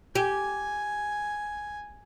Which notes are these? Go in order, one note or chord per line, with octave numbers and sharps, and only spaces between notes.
G4 G#5